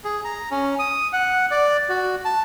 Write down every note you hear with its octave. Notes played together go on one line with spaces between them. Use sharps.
G#4
A#5
C#4
D#6
F#5
D5
F#4
A5